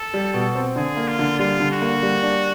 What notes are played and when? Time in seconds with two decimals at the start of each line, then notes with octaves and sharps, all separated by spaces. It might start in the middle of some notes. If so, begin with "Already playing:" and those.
Already playing: A4
0.14 G3
0.34 B2
0.55 C4
0.76 D3 G#4
0.97 A#3
1.08 F4
1.19 D3
1.39 G3 F4
1.60 D3
1.71 F#4
1.82 A#3
2.03 G3
2.23 D4